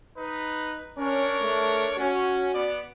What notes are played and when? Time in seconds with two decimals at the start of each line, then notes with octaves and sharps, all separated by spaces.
0.16 D#4 B4
0.97 C#4 D4 A#4 C#5
1.41 A3
1.98 C#4 F#4
2.53 B3 D5